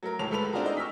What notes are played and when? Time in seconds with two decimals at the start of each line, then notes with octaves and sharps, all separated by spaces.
0.03 F#3 A3 A#4
0.19 D1 C#2 A2 C#5 A5 F7
0.31 C#2 A3 A4 B4 B5 F7
0.53 C4 D4 F4 F#4 G#4 A#4
0.64 D#4 E4 D5 D#5
0.77 C#6 E6 F6 B6